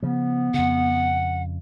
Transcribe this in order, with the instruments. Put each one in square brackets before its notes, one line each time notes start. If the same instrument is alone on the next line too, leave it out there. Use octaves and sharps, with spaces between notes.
[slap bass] C#3 F3 [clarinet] B3
[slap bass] F2 C#3 [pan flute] F#5